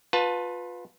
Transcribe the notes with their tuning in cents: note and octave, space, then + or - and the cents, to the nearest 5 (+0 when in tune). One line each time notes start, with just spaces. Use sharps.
F4 +30 B4 +0 A5 +0